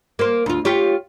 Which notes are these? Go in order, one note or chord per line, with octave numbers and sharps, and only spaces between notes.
A#3 C5
D2 F4
F4 G4 C#5